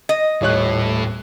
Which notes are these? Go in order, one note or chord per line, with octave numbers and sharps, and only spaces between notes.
D#5
D#1 A2 C#5 F#6